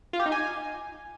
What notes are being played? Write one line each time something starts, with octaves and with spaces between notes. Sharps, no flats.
F4
G4
D#4
G#5